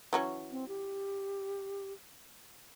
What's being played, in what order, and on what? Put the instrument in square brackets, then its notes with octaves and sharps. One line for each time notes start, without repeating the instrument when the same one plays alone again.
[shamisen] E3 F#3 C#4
[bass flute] C4
G4